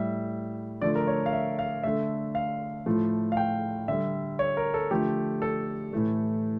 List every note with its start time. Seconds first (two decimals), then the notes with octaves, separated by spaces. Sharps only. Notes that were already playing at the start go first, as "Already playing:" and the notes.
Already playing: A2 G3 E5
0.82 D3 F3 A3 D5
0.95 A#4
1.07 C#5
1.26 F5
1.33 E5
1.59 F5
1.83 D3 A3 E5
2.35 F5
2.86 A2 F3 A3
3.32 F5
3.37 G5
3.88 D3 G3 E5
4.39 C#5
4.57 A#4
4.74 A4
4.91 D3 F3 A3 G4
5.42 A4
5.93 A2 E3 A3